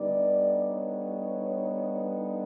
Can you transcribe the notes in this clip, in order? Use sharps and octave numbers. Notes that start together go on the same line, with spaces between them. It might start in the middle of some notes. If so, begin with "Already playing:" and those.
Already playing: D3 G3 B3 D#4 D5
C#5